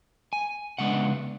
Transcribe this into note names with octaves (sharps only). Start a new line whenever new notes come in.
G#5
C#3 G#3 B3 D4 F#5